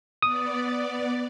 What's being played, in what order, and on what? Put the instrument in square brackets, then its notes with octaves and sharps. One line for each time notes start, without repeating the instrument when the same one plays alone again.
[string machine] B3 D5 [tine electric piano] D#6